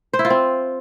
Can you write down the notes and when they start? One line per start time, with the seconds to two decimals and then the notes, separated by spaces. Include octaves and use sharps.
0.13 C5
0.19 E4
0.25 F4
0.30 C4